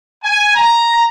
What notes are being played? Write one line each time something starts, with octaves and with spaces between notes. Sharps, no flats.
G#5
A#5